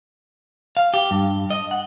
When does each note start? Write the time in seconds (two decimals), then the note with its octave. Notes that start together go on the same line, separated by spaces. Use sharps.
0.77 F5
0.94 G4
1.11 G2
1.50 D#5
1.71 F#5